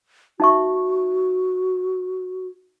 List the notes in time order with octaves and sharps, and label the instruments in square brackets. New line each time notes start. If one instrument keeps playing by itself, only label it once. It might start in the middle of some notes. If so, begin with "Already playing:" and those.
[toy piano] D#4 E5 C#6 [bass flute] F#4